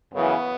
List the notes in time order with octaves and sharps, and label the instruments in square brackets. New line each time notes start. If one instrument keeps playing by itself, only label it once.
[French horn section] F#2 C#3 E3 B3